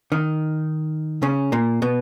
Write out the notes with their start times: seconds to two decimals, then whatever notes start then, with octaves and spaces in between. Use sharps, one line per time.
0.12 D#3 D#4
1.23 C#3 C#4
1.52 A#2 A#3
1.82 B2 B3